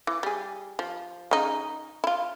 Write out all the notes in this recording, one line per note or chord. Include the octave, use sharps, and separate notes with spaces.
E3
G3 G#4
F3
C#3 D#4
E4 F4